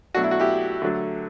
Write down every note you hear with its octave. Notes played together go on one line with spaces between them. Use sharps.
B2 F#3 A3 D4 F#4
E4
F#4
E4 G4
D3 F#3 A3